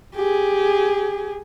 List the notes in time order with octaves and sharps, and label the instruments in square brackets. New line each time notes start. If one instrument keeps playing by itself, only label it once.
[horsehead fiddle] G4 G#4